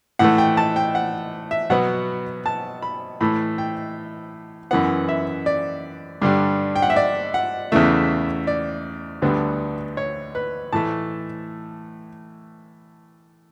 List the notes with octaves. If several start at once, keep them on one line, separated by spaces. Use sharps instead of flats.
A2 E3 A3 F#5
G5
A5
G5
F#5
E5
B2 F#3 B3 F#5
A5
B5
A2 E3 A3 B5
G5
F#2 E3 B3 F#5
E5
D5
G2 D3 G3
G5
F#5
E5
D5
F#5
E2 C#3 E3 A3 E5
D5
D2 D3 G3 B3
C#5
B4
A2 E3 A3 A5